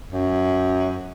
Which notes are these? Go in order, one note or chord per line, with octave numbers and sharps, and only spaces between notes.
F#2